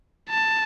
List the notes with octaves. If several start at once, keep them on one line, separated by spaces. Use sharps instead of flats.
A5